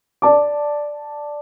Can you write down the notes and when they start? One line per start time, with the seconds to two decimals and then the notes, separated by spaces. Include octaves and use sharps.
0.22 D5 A5 D6